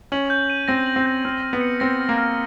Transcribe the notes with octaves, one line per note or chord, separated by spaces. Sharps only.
C#4 F#7
G6
D#7
C4 A#6
F#7
C4
G6
C4 F6
F6
B3
C#7
C4 A#6
F6
A#3
F6